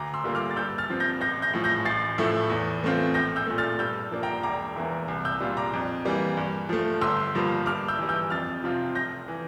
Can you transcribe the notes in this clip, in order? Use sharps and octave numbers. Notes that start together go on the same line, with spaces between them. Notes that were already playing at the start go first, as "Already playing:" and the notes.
Already playing: D2 A#5 D6
C6 E6
D3 G3 A#3 F4
D6 F6
A6
G2 E6 G6
F6 A6
F3 C4
G6 A#6
A1 G6 A#6
G6 A#6
A2 F3
G6 A#6
A1 A6 C7
A2 F3 A3 E4
E2
E3 A3 C4 F4
A#1 G6 A#6
E6 G6
A#2 A3
F6 A6
G2 E6 G6
F3 A#3 D4
G5 A#5
E1 A#5 D6
E2 E3 A#3 E4
C2
E6 G6
A#2 G3 D4 F4
A#5 D6
F2
E3 G3 A#3
G2
F3 A3
G1 C6 E6
G2 F3 A#3
G2 D6 F6
E6 G6
E3 G3
E6 G6
F2 F6 A6
C3 F3 C4 F4
F1 G6 A#6
E3